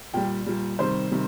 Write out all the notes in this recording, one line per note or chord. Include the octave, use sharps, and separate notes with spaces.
A#2 G3 G5
A#2 G3
C3 D#3 G3 C5
C3 D#3 G3